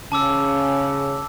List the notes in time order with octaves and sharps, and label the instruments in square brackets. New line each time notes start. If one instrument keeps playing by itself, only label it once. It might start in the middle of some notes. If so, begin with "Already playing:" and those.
[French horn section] C#3 C#4 [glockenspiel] A5 D6 E6